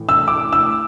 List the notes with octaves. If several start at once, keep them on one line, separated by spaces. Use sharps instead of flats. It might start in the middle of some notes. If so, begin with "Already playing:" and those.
Already playing: A2 E3
E6
D6
E6